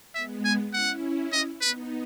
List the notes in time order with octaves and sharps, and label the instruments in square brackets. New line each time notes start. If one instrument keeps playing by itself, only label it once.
[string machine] G#3 B3 [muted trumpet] E5
[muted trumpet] G#5
[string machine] C#4 E4 [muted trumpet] F#5
[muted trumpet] D#5
[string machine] B3 D#4 [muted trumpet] B4